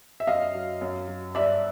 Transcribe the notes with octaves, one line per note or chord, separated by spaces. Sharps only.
E5
F#2 D#5 F5
F#3
F#2
F#3
G2 D5 E5